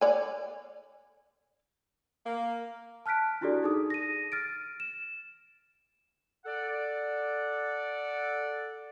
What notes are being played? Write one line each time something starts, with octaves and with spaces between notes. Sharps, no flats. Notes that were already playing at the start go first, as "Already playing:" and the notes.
C#5 D5 G#5
A#3
A5 F6 F#6 B6 D7
D4 E4 F#4 G4 A4 D5
D#4 G#4 D#6
A#6 D#7
F6 A6 D7
E7
A4 D5 F#5